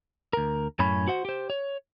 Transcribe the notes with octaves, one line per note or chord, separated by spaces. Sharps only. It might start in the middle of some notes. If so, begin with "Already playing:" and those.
D2 A#4
F#2 A2 C#4 C#5 B5
F#4 C5 F#5
G4 C5
C#5